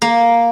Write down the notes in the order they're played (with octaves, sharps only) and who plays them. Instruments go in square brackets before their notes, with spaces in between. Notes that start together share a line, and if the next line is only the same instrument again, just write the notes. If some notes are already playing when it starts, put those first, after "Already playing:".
[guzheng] A#3